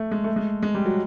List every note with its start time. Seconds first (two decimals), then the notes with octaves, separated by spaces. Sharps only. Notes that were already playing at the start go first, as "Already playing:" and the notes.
Already playing: A3
0.11 G#3
0.24 A3
0.36 G#3
0.63 G#3
0.75 G3
0.86 F#3